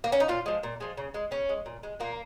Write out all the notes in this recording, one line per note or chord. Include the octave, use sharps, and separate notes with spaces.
A#3
C#4
D#4
A#2 F4
F3 G#3
A#2
F3 G#3
C#3
G#3
C#3 C#4
G#3
A#2
G#3
A#2 A#3